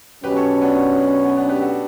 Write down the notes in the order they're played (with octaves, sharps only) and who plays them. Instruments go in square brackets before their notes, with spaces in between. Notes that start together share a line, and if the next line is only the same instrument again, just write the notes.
[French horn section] B2 F#3 C#4 [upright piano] G4 B4
[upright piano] A4 C#5
B3 D4
B3
B3 D4
G4 B4
F#4 A4